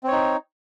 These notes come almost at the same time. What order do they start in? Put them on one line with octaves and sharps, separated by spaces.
C4 C#5 D#4